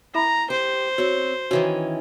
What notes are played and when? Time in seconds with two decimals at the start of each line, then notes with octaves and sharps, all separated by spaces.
0.15 E4 E5 A#5 B5
0.50 G4 C5
0.98 C4 F#4 C#5
1.51 D#3 E3 C#4 F#4